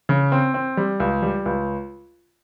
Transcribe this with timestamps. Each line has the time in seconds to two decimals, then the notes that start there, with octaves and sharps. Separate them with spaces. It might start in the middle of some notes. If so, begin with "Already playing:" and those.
0.09 C#3
0.32 C4
0.54 C4
0.77 G3
1.00 C#2
1.22 G3
1.46 C#2